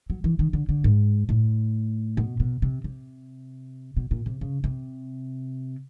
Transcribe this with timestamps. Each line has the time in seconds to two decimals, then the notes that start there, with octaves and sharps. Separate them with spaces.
0.10 F#3
0.24 E3
0.39 D#3
0.53 D3
0.69 D3
0.84 G#2
1.29 A2
2.17 B2
2.40 B2
2.62 C3
2.84 C3
3.97 B2
4.11 A#2
4.26 C3
4.41 C#3
4.64 C3